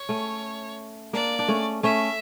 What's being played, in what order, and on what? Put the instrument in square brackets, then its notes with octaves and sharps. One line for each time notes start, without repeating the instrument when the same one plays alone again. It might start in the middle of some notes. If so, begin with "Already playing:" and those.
Already playing: [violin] C#5
[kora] A3 C#4
[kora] A#3 D4 [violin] D5
[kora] D4
A3 C#4
[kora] A3 C#4 [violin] E5